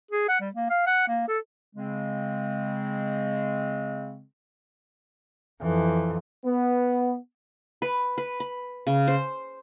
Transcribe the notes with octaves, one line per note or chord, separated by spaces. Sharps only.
G#4
F#5
G3
A#3
F5
F#5
A#3
A4
C#3 G#3 C4
F2 E3
B3
B4
B4
B5
C#3
C5